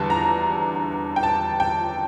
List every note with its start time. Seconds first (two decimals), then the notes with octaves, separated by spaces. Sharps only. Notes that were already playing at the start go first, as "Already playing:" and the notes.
Already playing: E2 D3 G3 D4 A5
0.10 A#5
1.16 G5
1.23 A5
1.60 G5